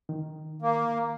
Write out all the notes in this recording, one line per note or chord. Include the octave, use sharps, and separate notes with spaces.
D#3
A#3